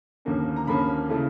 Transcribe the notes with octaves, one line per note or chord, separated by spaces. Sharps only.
D#2 D3 F3 A#3 C#4
A#5
D#2 D3 F3 A#3 C#4 B5
C#3 E3 A3